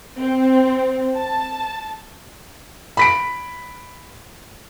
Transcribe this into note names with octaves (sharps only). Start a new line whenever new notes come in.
C4
A5
B5 B6 D7